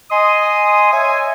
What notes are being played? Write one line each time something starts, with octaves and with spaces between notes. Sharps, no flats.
D#5 G#5 C6 D#6
C#5 E5 G#5